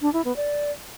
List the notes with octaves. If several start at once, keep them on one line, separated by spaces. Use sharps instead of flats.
D4
E4
B3
D5